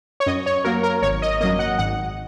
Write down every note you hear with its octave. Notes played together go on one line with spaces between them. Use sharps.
C#5
F#2 D#5
C#5
F#3 A#3 A#4
A#4
G#1 C#5
D#5
F#2 F#3 A#3 D#5
F#5
G#1 F#5